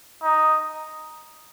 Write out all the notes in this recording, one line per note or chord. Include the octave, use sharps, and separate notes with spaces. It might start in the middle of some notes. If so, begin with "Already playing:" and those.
D#4